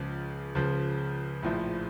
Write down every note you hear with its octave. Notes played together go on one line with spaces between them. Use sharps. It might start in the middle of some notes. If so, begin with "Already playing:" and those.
Already playing: C#2 C#3 F3
C#2 C#3 F3
A#1 A2 F3